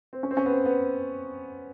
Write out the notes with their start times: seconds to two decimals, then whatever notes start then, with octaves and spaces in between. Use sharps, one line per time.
0.13 C4
0.23 C#4
0.31 C4
0.37 C#4
0.46 B3
0.51 C4
0.66 B3